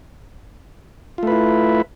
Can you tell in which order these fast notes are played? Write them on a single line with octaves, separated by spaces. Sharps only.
F4 A3 B4 E4